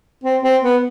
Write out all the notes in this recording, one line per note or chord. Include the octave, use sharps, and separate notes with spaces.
C4
C4
B3